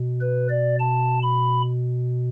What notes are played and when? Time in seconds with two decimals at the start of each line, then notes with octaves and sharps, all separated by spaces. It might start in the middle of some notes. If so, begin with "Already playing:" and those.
Already playing: B2
0.21 B4
0.49 D5
0.80 A5
1.23 B5